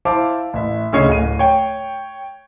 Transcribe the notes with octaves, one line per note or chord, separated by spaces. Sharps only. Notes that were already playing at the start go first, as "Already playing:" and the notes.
E4 C5 F5 A5 D6
A1 E5
D2 C#3 C#5 D#5 C7
D1 D#7
C#5 G5